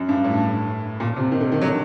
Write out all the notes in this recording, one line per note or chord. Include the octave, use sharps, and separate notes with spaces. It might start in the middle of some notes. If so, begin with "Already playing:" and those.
Already playing: F#2
G2
A2
A#2
C3
D#3
D3
D#3
F#3